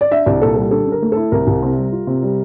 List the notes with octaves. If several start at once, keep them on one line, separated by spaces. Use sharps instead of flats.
D5
D4 E5
C2 D5
A#2 A4
G3 A4
D3 A4
D3
A#4
A3
E4 A4
C2 A#4
C2
C3
G3
F4
C3
G3